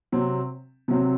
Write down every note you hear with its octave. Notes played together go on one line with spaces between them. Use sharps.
C3 F#3 C4
C3 F#3 C4